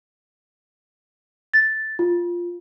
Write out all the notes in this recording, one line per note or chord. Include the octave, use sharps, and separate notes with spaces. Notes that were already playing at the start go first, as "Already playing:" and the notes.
A6
F4